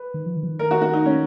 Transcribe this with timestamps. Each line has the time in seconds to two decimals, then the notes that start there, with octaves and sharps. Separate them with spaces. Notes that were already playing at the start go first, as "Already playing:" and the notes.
Already playing: B4
0.14 D#3
0.26 F3
0.37 D#3
0.43 F3
0.48 D#3
0.59 A#4
0.71 F#4
0.82 F#4
0.93 D#4
1.05 C#4